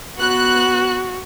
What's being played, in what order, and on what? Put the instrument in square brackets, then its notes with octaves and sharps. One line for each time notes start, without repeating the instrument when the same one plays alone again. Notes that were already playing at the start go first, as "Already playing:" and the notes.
[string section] B3 F#6 [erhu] F#4